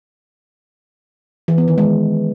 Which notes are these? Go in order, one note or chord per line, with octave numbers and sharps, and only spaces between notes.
E3
B3
D#3
G#3